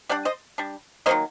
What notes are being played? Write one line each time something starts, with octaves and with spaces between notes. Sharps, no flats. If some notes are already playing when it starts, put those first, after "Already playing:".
G3 D4 D5 F#5
C5 D#5
G3 D4
D#3 F#3 A#3 C5 D#5